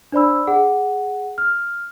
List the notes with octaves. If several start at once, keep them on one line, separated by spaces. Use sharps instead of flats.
D4 C5 D5 B5 E6
G#4 F#5
F6